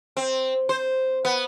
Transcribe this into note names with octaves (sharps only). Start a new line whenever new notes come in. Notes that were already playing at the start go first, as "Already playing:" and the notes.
C4
C5
B3